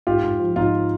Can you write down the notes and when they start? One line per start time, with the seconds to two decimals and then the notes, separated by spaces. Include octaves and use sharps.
0.07 G#2 F4 G4
0.23 G#2
0.39 F3
0.56 G#2 D#4 F4